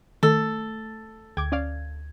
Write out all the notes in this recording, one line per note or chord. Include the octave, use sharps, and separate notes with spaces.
D#3 A3 A4
D2 G5 D6 G#6
C#4 D5 F5